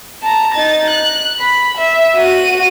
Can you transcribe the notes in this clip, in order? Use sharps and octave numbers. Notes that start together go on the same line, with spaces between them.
A5 A#5
D#4 A6
F#6
B5
E5
F#4 D#7